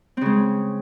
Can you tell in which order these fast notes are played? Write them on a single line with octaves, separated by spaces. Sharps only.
C4 C#3 G#3